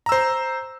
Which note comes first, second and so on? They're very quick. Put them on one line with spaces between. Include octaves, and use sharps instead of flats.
A#5 E6 C5